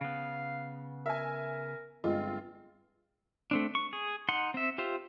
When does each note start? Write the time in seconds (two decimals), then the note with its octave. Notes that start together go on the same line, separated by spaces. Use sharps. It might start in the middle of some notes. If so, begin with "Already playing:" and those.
0.01 C#3 B3 F5
1.06 A#4 E5 G#5
2.04 G1 G#3 C4 F4 D#5
3.51 A3 C4 D4
3.75 C#6
3.93 G#4
4.29 D#4 F#5 C6
4.54 C4 E5
4.78 F4 G4 C5 E5